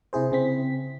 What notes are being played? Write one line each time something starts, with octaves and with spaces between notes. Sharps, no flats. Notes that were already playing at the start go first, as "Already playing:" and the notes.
C3 E4 G#4 C5
C#3 C4 B6